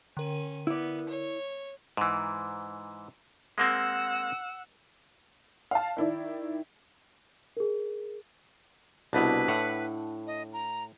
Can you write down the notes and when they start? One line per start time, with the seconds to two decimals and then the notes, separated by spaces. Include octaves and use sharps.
0.17 D3 C#4 A#4 D#7
0.67 B3 E4 D5
1.09 C#5
1.97 G#2 E3
3.58 G#3 A#3 C4 F#5 E6
5.71 F5 A5
5.97 D#3 E4 D5
7.57 G#4 A#4
9.13 C2 B2 D4 E4 B4
9.48 A2 F#5
10.27 D#5
10.53 A#5